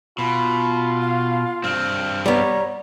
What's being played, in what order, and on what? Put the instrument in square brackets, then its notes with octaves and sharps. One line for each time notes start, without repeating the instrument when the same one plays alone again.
[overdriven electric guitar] B2 [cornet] F4 [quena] B5
[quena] F5
[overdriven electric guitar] G2 C4 [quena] F6
[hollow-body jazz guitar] G3 B3 [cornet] C#5 [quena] A#5